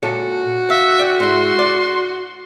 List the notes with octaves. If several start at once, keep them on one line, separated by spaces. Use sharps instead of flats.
A#2 F#4 A4 C#5
E5 F5
D5 G5
G#2 E4 C6
D5